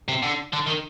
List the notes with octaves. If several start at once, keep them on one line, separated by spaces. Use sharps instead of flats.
C3
D3
D3
D#3